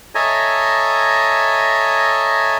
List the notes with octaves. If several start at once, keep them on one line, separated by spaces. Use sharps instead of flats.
A4 C#5 D#5 E5 G#5 A#5